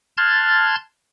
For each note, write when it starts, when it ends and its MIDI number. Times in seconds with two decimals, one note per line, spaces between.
0.17 0.75 81
0.17 0.75 84
0.17 0.75 89
0.17 0.75 90
0.17 0.75 92
0.17 0.75 93